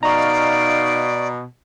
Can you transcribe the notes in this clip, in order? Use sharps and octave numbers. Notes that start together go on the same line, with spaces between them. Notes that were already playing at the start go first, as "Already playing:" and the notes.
B2 D#4 D5 F5 A#5 C#6